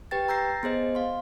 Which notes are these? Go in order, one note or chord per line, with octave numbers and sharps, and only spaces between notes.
G4 B4 G5 A6
A#5 E6 G6 A6 A#6 C7
B3 G#4 C5 D#5
F5 C6